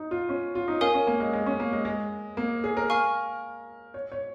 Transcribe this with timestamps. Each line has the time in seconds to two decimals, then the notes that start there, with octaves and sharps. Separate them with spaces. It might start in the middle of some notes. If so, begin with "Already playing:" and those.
Already playing: D#4
0.11 F4
0.29 C#4
0.55 F4
0.68 D#4
0.81 C#4 A#4 F5 G#5 D#6
0.94 C#4
1.07 A#3
1.20 G#3
1.33 G#3
1.46 C#4
1.60 A#3
1.73 G#3
1.85 G#3
2.37 A#3
2.64 G#4
2.77 A#4
2.90 F5 G#5 C#6 F6
3.94 C#5
4.12 C#5